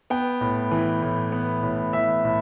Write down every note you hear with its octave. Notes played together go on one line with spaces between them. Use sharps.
B3 G5
A2
E3
A2
B3
A2
E3 E5
A2